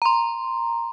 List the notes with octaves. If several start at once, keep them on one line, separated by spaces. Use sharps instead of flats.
A#5 C6